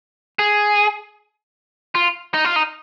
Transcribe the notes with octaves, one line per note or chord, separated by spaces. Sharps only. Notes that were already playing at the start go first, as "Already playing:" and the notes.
G#4
F4
D#4
F4
D#4